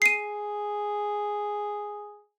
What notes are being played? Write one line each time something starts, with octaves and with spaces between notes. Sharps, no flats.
G#4 C7 D#7